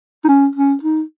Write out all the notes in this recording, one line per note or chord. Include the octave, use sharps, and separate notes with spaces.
D#4
C#4
C#4
D#4